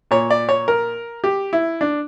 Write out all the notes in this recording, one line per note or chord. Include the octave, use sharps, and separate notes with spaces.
A#2 C#5
D5
C#5
A#4
G4
E4
D4